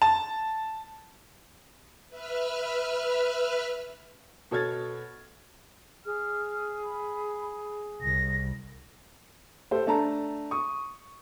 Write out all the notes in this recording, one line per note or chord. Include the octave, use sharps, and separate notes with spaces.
A5
B4 E5 F6
B2 A4 C#5 F6 G#6 A6
G#4 F6
B5
C2 A#6
A3 G4 A4 C5
A3 D4 A5 A#5
C#6 D#6